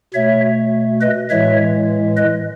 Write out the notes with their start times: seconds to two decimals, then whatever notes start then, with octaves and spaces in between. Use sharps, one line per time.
0.14 B2 A3 C#5 E5
1.01 B4 D#5
1.30 A2 E3 G#3 C#5 E5
2.17 B4 D#5